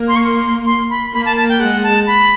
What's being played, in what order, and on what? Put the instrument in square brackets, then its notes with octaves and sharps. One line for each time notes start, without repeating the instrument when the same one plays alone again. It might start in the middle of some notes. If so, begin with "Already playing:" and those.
Already playing: [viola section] A#3
[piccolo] C6
C#6
C6
C6
B5
[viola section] A#3 [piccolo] B5
[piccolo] A5
A5
G5
[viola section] G#3 [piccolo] F#5
[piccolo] A5
B5